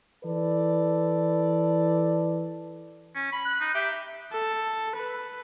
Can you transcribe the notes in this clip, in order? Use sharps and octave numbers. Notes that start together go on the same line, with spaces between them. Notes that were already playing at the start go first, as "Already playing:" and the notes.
E3 A4 B4 D5
C#4
B5
F#6
D#4
G4 E5
A4
B4